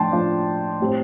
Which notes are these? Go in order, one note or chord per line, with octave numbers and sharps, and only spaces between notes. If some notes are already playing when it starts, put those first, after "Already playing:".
Already playing: A2 F3 D4 G5 A5 C6
A2 F3 D4 F4
A2 G3 C4 F4